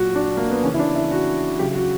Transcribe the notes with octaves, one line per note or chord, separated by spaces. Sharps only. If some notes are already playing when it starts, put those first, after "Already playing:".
Already playing: A#2 F#3 F#4
D4
A#3
B3
C#3 E3 C#4
E4
D4
E4
F#4
C#3 F#3 G4
F#4